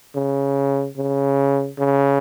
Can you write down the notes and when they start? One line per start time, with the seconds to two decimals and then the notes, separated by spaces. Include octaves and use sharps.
0.15 C#3
0.97 C#3
1.79 C#3